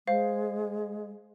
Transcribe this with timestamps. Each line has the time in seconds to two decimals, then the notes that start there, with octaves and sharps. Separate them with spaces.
0.07 G#3 C5 F5